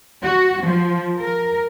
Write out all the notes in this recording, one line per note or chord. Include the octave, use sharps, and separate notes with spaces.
F#4
F3
A#4